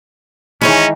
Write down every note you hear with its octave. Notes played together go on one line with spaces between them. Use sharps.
D#3 E3 G#3 C#4 D#4 G#4 C#5